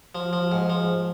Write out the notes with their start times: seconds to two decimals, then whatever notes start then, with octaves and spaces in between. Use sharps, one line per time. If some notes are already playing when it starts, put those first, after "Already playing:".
0.15 F3
0.33 F3
0.52 G#2
0.70 F3